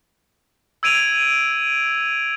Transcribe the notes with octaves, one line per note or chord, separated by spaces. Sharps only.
E6 G#6 D7 D#7 F7